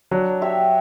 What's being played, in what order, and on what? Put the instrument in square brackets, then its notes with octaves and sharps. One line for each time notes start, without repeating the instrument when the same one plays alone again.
[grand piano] F#3 [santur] D4
[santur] G4 C#5 E5